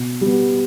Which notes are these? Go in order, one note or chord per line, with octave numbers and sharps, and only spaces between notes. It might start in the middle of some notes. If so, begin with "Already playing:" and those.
Already playing: B2
G3
B3